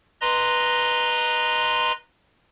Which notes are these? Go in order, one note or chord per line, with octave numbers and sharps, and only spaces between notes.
B4 D#5 A#5 C6